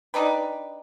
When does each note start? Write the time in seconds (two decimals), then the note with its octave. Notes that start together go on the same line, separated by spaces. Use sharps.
0.14 D4 D#4 G4 B4